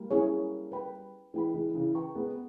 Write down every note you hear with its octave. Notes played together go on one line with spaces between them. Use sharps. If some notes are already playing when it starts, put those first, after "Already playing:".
Already playing: G3 A#3
C#4 E4 G#4 C#5
B4 G5 B5
E3 G#3 B4 G5 B5
E3 G#3
C#3 E3
B4 G5 A#5 C#6
G#3 B3